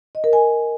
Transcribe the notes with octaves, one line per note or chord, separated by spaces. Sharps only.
D#5
A#4
G#5